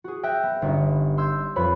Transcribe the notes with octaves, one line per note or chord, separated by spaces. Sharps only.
F#4 G#4
E5 G5 E6 F#6 G6 A#6
B3
G1 C#4 D#4
C6 E6 G6 G#6
F2 B4 C#5 B5